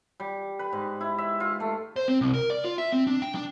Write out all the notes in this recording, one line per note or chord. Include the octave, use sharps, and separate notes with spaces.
G3
B4
G#2
E4
E5
F4
A3
C5
C4
C2
A#4
D5
F4
E5
C4
D4
G5
D4